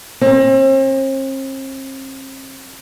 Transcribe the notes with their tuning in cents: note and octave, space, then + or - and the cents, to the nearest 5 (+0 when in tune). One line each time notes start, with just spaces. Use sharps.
C4 +40